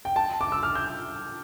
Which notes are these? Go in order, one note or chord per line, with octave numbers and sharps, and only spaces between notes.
G5
A5
D6
E6
F6
G6